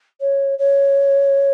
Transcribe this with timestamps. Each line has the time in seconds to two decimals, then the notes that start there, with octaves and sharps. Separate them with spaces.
0.20 C#5
0.58 C#5